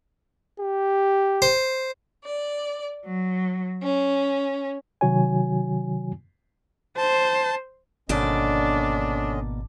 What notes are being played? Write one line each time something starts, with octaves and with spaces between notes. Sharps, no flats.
G4
C5
D5
F#3
C#4
C3 D#3 F#3 F#4 C#5 G#5
C5 A5
G#1 B2 D3 A#3 C#4 D4 D5 D#5